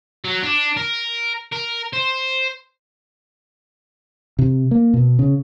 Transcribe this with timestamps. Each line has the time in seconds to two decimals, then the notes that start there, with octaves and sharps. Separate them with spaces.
0.24 F#3
0.42 D4
0.77 A#4
1.53 A#4
1.93 C5
4.39 C3
4.71 A#3
4.94 B2
5.19 C#3